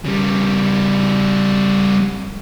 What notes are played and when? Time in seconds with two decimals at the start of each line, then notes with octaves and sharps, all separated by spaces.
0.05 C#3 G3